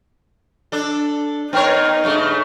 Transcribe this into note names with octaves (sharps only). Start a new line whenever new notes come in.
D4 A4
B3 D#4 A#4 C#5
G2 C#3 A3